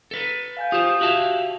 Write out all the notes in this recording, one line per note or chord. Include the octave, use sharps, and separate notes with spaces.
A4 B4
F5 G#5 G6
F4 G4 C5 D#6
F#4 G4 E5 F5 A5 F#6